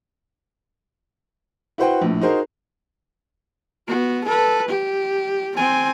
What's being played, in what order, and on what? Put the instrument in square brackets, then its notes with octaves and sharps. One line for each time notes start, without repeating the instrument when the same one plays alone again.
[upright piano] E4 F#4 B4 C5 F#5 G5
A#1 A2
D#4 F#4 G#4 A#4 C5
[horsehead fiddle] B3 F#4
A4 B4
G4
C4 G#5